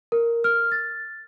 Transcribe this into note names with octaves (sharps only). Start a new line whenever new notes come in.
A#4
F6
A6